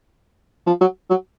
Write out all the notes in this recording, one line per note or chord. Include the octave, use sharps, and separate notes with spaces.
F3
F#3
F#3